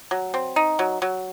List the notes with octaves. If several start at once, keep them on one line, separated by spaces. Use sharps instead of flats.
F#3
C4
D#4
F#3
F#3